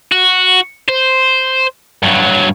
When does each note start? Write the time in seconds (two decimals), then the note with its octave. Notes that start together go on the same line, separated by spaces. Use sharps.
0.12 F#4
0.88 C5
2.03 G2 F#3